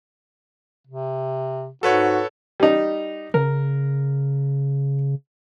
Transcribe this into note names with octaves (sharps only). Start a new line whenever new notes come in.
C3
G#2 F#4 A4 B4 C#5
G3 D#4
C#3 A#4